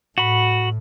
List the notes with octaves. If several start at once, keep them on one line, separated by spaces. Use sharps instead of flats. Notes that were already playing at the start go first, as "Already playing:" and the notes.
A2 F#4 B5